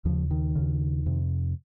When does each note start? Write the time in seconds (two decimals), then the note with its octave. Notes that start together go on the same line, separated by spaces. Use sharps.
0.05 D#2 C#3 F3
0.31 D#3
0.56 D#2 C#3
1.06 F2 C3